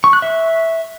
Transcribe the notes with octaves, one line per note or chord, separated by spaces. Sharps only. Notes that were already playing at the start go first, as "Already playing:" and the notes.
C#6
F#6
E5